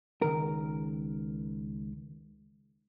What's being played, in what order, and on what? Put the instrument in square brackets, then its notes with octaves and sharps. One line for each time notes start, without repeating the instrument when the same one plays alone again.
[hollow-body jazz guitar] C#2 D#3 A#4